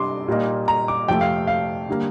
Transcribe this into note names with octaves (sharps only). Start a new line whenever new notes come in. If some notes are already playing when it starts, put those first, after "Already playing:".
Already playing: C3 G3 D4 C6 D6
A#2 G3 A#3 D#4
A#5
D6
F2 C3 F3 A3 G5
F5
F5
D3 G3 A#3